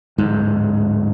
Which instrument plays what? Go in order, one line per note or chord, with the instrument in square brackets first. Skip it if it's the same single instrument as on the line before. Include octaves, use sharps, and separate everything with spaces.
[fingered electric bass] D1 G#2